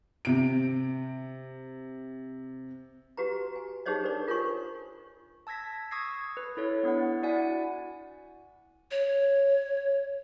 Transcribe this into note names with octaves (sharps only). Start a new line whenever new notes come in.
C3 D7
F#4 G4 B4 A#5
G#5
D#4 G4 G#4 C5 C#5 D#5
D4 A#4 C5 D5
F4 A#4 C#5 G#5 C#6
A5 E6 G#6 A#6 B6
C#6 D#6 E6 G#6 A#6 C7
B4
E4 A4 C#5
B3 D4 E4 F#5
E4 F#4 D5 F#5 G#5
C#5